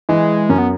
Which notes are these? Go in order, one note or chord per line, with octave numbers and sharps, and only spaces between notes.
E3 G#3
F#2 C#4
B3